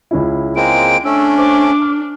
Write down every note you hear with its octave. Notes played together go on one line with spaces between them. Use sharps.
C#2 C#4 E4
G#3 A#3 C4 D7
A3 C#4 D4 E6
C5 D6
F6